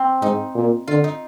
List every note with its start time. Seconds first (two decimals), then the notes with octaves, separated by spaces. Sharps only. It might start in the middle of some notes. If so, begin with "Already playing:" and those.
Already playing: C4
0.22 G#2 D#4
0.55 A#2
0.87 D3 F4
1.04 D#4